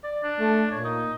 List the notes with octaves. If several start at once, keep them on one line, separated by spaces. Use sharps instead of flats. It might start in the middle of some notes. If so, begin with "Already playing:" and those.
D5
D4
A3
A#2 C#5
D#4